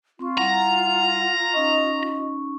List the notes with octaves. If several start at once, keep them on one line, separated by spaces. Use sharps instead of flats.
C4 F4 C6 C#6
G3 E4 F#5 A#5
C#4 D#4 D#5 C#6